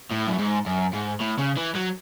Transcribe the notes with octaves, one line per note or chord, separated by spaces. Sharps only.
A2
F#2
G#2
F#2
G#2
A2
C#3
E3
F#3